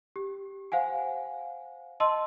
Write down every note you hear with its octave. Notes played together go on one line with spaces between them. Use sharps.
G4
C5 F5 F#5 G#5
D#5 A5 C6 E6